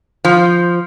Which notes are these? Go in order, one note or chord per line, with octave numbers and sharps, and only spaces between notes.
F3